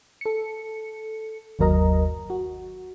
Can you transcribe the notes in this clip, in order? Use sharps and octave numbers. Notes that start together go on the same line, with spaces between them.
A4 C#7
G1 D#2 F#3 A#4 D#5 A#5
F#4